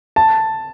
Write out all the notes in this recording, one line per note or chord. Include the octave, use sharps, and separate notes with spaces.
A5